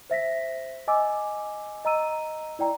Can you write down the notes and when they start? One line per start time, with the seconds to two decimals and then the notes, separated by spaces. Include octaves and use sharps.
0.10 C5 E5 A#6 B6
0.88 D#5 G#5 D6 E6
1.85 D#5 A#5 E6 D#7
2.59 E4 D5 G5 A#5